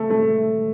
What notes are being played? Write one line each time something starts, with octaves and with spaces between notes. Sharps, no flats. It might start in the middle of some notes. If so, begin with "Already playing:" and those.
Already playing: A3
A3